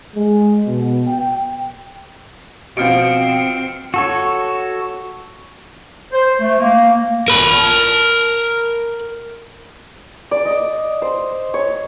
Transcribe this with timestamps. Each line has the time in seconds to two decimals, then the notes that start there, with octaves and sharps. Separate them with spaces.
0.16 G#3
0.67 B2
1.07 G5
2.77 B2 F3 C4 F6 C#7 D7
3.94 F#4 A4 C#5
6.12 C5
6.41 A3
6.60 A#3
7.28 A#4 B5
10.31 D5
10.45 D#5
11.02 C5
11.54 C#5